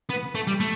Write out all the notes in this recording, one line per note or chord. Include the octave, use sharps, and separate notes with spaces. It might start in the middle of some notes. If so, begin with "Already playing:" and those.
B3
A3
G3
A3